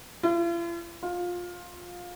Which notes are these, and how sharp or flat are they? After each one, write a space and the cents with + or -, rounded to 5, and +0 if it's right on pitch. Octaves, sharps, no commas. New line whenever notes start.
F4 -45
F4 +20